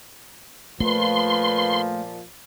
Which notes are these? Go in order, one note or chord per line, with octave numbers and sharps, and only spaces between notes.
A#2 F3 A3 B4 C6